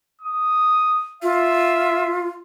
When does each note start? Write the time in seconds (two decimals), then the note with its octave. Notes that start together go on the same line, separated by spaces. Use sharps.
0.21 D#6
1.23 F4 E5